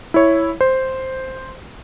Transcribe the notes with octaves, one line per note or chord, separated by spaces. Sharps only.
E4 C#5
C5